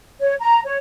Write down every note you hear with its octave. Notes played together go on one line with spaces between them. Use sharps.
C#5
A#5
C#5